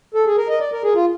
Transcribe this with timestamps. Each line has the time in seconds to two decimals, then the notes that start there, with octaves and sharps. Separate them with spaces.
0.14 A4
0.26 G#4
0.38 A#4
0.49 D#5
0.60 D5
0.72 A#4
0.83 G#4
0.95 F4